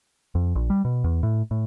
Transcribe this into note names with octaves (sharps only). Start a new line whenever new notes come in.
F2
A#1
G3
B2
E2
A2
A2